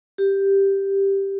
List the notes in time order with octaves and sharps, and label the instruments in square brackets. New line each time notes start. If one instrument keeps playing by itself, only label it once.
[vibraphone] G4